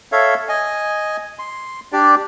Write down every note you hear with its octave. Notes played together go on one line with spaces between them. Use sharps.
A4 C#5 E5 F5
D#5 G#5
C6
D4 G4 D5